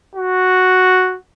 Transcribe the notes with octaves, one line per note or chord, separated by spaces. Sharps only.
F#4